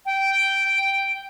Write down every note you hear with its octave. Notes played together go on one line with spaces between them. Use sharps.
G5